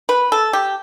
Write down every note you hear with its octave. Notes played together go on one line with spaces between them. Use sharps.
B4
A4
G4